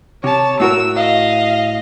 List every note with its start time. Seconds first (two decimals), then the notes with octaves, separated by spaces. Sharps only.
0.24 C3 C#5 A5
0.60 A2 F#4 A#4 E6
0.96 D#5 F5